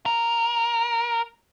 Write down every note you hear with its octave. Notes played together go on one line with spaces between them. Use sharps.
A#4